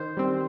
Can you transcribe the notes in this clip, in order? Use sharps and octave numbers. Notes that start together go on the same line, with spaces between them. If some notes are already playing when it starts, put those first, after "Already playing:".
Already playing: D#3 C5
G3 C4